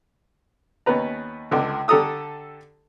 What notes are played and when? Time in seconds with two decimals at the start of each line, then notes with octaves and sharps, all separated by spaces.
0.86 D#2 B3 C#4 B4 A#5
1.51 C#2 D3
1.88 D3 G4 A4 A#5 D#6 E6